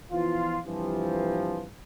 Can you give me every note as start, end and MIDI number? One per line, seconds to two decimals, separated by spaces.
0.12 0.58 52
0.12 0.58 53
0.12 0.58 59
0.12 0.58 65
0.65 1.64 43
0.65 1.64 48
0.65 1.64 52
0.65 1.64 53